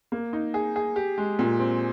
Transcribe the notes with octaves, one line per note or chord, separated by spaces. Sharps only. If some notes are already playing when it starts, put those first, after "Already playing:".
A#3
D#4
G#4
G#4
G4
G#3
A#2
C4